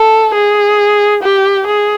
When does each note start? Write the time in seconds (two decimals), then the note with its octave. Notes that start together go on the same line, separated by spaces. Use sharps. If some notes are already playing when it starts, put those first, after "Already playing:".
Already playing: A4
0.34 G#4
1.23 G4
1.67 G#4